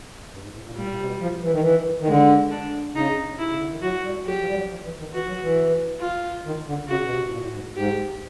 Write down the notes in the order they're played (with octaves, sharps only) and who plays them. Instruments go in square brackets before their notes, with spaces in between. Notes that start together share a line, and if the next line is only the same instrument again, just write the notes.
[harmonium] G2
G#2
A2
A#2
[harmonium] A#2 [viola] G3
[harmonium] A#2
C3
B2
F3
E3
D#3
E3
D#3
[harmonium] D3 [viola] G#3
[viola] D4
[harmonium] C#3 [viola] D#4
[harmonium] C3 [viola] E4
[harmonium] C#3
D3
D#3
[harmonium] F#3 [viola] F#4
[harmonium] G3
[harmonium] F#3 [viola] G4
[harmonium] F3
G3
F#3
F3
E3
D#3
[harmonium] E3 [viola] F#4
[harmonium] F#3
E3
[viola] F4
[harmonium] D#3
D3
[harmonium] C#3 [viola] F#4
[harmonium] B2
C3
A2
A#2
A2
G#2
[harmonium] G#2 [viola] G4